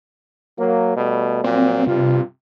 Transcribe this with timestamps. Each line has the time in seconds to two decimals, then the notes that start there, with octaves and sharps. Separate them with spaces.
0.58 F#3 A#3
0.96 B2 G3 A3
1.44 A#2 F3 F#3 C4
1.87 G2 C3 F4